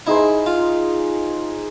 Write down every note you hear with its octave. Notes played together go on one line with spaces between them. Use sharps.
D#4 E4 G#4 C5
F4